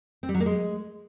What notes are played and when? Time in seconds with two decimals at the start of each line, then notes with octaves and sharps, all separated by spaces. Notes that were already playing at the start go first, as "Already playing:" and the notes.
0.23 C4
0.29 G3
0.34 F#3
0.40 A#3
0.46 G#3